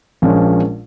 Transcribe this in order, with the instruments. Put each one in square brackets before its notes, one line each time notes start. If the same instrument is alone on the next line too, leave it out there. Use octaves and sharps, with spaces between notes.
[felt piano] A#1 A#2 F3 G#3 C#4